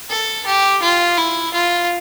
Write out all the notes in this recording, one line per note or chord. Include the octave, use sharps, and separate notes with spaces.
A4
G4
F4
E4
F4